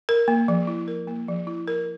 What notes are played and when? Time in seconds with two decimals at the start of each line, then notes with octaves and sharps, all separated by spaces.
0.09 A#4
0.28 A#3
0.48 F3
0.67 E4
0.88 A#4
1.07 A#3
1.28 F3
1.47 E4
1.68 A#4